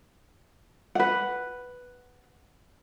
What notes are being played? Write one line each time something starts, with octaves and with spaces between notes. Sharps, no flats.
B4 F#5